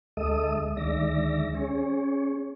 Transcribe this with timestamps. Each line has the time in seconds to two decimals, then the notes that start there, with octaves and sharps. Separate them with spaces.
0.17 D2 G#3 A4 D#5 E5 D#6
0.77 D2 D#3 G#3 D5 E5 A#6
1.55 C#4 G#4 C#5